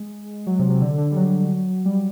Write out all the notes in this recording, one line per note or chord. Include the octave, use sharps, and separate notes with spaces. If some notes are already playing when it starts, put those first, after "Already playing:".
Already playing: G#3
F#3
C3
C3
D3
D3
G3
F#3
G3